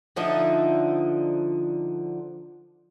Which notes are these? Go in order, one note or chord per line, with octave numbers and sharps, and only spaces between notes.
D3 F3 D#4 E5